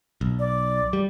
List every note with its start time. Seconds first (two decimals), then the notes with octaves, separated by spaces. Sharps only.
0.21 B1
0.39 D5
0.93 G3